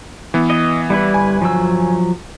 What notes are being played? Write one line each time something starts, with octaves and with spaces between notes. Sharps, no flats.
E3 B3
D#5
G3 E4 B4
G1 G#5
F3 F#3 E6